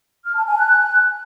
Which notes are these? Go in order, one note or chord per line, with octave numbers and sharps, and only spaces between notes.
F6
A5
G#5
F#6